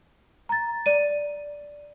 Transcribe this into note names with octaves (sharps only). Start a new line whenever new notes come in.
A#5 A6
D5 D#7